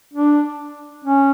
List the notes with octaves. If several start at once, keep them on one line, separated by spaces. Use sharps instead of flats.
D4
C#4